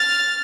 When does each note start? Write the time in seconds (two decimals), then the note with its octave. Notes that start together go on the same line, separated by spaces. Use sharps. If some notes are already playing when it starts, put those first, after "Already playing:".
Already playing: F6 A6